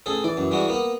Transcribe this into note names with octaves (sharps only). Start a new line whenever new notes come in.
A1 G#4 A4
E3 D5
F#2
G3 G#3 F#4
A#3 B3